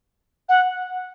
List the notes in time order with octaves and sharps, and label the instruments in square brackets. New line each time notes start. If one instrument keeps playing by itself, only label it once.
[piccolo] F#5